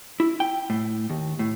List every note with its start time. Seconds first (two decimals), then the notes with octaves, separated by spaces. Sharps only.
0.20 E4
0.40 G5
0.70 A2
1.10 D#2
1.39 A2